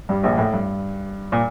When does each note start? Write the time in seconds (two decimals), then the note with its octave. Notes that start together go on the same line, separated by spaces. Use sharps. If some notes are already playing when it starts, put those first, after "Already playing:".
0.09 G2 G3
0.23 A#1 A#2
0.38 A2
0.53 G2
1.32 A#2